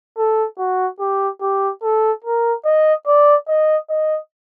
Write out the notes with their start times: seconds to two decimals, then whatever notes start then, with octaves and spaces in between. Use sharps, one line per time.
0.18 A4
0.59 F#4
1.00 G4
1.41 G4
1.83 A4
2.25 A#4
2.65 D#5
3.06 D5
3.48 D#5
3.90 D#5